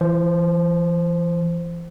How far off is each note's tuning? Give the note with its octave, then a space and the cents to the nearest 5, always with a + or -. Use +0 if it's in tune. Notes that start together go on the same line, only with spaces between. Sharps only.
E3 +35 C5 +0